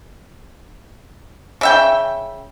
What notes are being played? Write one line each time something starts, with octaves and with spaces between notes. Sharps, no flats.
C#3 E5 G5